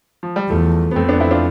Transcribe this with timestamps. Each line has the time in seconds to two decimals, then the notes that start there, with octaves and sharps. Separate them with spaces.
0.23 F3
0.36 G3
0.49 E2 F3 A3
0.91 B3
0.96 F2 A3 C4
1.09 B3 D4
1.20 C4 E4
1.31 D4 F4